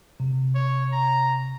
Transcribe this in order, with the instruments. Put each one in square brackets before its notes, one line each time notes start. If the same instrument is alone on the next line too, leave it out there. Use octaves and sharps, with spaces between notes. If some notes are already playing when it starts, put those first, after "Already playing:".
[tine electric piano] C3
[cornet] C#5
A#5